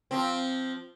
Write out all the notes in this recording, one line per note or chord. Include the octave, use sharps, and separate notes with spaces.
F3 C4